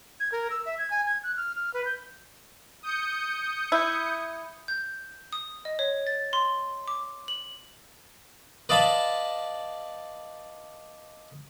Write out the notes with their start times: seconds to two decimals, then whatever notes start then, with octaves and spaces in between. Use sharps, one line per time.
0.20 G#6
0.32 A#4
0.50 E6
0.66 E5
0.78 G#6
0.91 G#5
1.06 G#6
1.24 F#6
1.37 F6
1.55 F6
1.74 B4
1.86 G6
2.83 D#6 G6 C#7
3.72 E4
4.68 G6
5.33 D#6
5.65 D#5
5.79 C#5
6.07 A6
6.33 C6
6.88 D6
7.28 F#7
8.69 B4 D5 D#5 F5 A5 B5